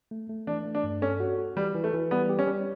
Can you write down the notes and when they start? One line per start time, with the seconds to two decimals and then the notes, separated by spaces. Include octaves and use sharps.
0.11 A3
0.29 A3
0.47 E3 D4
0.66 A3
0.75 D4
0.84 G2
1.02 C#4 A4
1.20 F#4
1.38 F#4
1.57 E3 G3
1.74 E3
1.84 A3
1.93 E3
2.11 G3 B3
2.29 G4
2.39 C#4
2.47 G3